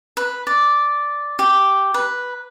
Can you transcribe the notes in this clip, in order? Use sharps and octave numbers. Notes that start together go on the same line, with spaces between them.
B4
D5
G4
B4